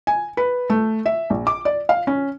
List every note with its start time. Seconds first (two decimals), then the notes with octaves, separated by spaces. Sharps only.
0.07 G#5
0.37 B4
0.70 A3
1.06 E5
1.30 A#1
1.47 D6
1.65 D5
1.89 F5
2.07 C#4